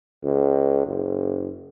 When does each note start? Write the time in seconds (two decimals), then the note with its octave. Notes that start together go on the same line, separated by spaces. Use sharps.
0.23 C#2
0.87 F#1